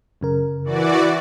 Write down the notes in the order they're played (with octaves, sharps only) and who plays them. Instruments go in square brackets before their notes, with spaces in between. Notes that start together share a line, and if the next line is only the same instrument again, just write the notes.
[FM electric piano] F#2 C#3 A#4
[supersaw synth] E3 F#4 D5